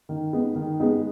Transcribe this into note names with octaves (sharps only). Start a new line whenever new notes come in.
D#3
G#3 B3 D#4
D#3
G#3 B3 D#4